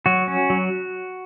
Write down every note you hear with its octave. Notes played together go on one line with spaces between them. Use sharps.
F#3 F#4
C#4
F#3